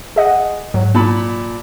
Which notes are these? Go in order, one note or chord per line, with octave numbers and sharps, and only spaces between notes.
G#4 D#5 F#5
G#2 F#3
A#2 A5 B5